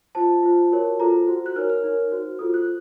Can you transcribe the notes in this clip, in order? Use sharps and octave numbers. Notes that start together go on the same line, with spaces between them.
F4 C5 A5
F4 C5
F#4 A#4 C#5
F4 A4 C5 A#5
F#4 C5
F#6
D#4 A#4 C#5 F6
F6
D#4 A#4 C#5
F#4 C5
F4 A4 C5 D#6
F#6